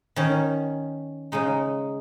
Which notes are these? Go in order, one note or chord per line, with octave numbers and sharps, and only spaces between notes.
D#3 C#4
C#3 G#3 D#4